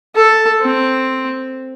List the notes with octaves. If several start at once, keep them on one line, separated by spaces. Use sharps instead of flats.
A4
C4